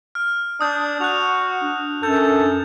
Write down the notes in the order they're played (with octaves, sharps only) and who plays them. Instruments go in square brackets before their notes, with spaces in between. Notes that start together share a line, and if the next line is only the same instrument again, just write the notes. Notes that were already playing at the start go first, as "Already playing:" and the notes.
[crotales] F6
[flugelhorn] D4 [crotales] D#6 G6
[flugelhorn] F#4 [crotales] F#6 F7
[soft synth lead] D4
[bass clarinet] F#2 [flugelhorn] A4 [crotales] G6